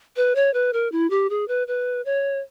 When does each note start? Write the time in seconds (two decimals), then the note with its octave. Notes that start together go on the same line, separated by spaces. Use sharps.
0.16 B4
0.35 C#5
0.54 B4
0.73 A#4
0.92 E4
1.10 G4
1.30 G#4
1.48 B4
1.67 B4
2.05 C#5